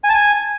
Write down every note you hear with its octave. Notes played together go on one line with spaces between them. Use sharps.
G#5
A5
G#5